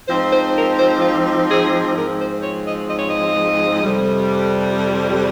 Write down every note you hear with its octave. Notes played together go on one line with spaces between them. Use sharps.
G#2 F3 C4 D#4 C5
C5
A#4
C5
F4
G#4
G#2 F3 C4 A#4
C5
C#5
D#5
D#5
C#5
D#5
F2 C3 G3